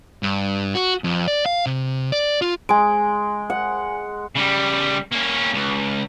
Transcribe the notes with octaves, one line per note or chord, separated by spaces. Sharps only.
G2
F#4
F2
D5
F5
C3
D5
F4
G#3 G#5 D7
F#5
C#3 G3
A#3 C#4
C#2